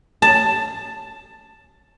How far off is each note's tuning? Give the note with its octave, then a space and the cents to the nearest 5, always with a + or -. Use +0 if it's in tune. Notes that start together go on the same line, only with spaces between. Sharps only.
A5 +5